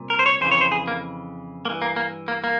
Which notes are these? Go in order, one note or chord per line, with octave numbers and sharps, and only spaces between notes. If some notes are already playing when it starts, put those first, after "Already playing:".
Already playing: C2 A#2
A#4
C5
C#5
F2 C#3 E3 C5
C#5
C5
G#4
A#3
G2 E3 A#3
A#3
A#3
A#3
A#3